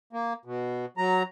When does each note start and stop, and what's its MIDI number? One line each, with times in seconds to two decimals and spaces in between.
0.13 0.33 58
0.45 0.86 47
0.97 1.23 54
0.97 1.23 82